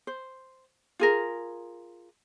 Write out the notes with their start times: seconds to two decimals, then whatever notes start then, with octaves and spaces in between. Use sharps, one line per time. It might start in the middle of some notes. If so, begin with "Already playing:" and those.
0.07 C5
0.99 F4 G#4 A#4